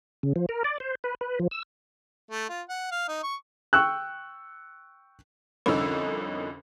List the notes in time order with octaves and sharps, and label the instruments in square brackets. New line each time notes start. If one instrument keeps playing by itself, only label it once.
[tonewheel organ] C#3
F3
A#4
D5
C5
B4
B4
F3
E6
[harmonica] A3
F4
F#5
F5
D#4
C#6
[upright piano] G5 C#6 E6 F#6
[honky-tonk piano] C2 F2 D3 C#4 D#4 E6